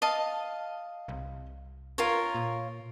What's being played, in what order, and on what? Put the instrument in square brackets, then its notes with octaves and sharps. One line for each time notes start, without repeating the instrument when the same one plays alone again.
[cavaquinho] D#5 F5 A5
[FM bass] C2
[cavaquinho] F4 A#4 C#5
[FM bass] A#2